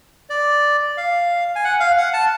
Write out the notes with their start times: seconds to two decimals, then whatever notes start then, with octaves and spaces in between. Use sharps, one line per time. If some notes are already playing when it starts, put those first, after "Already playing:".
0.30 D5
0.97 F5
1.56 G#5
1.64 F#5
1.80 F5
1.98 F#5
2.13 A5